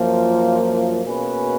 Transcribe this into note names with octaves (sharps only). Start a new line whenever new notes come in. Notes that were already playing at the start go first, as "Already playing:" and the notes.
Already playing: F#2 F3 A#3 F4
B2 A#3 C#4 G#4 B4